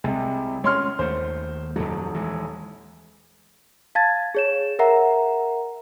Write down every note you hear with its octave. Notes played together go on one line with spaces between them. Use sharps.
C2 C3 G#3
G#3 C#4 C#5 C6 F6
D#2 A3 C5
D#1 F2 F#3
E3 G#3
F5 A5 G#6 A6
G#4 C#5 E7
A#4 E5 F#5 A#5